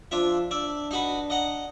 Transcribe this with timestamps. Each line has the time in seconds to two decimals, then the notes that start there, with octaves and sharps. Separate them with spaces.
0.11 F3 D4 F4 E5
0.51 D4 D5 E5
0.91 D#4 F#4 B4
1.30 D#5 F#5 A#5